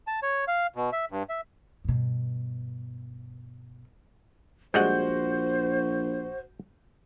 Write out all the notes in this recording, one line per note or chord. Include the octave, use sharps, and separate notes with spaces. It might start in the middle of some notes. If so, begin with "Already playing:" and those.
A5
C#5
F5
B2
E5
G2
E5
G2 B2
A#1 G3 G#3 F#4 C5 F#5 G6